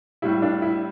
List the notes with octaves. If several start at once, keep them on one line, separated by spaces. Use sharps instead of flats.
A2 G3 E4
D4
E4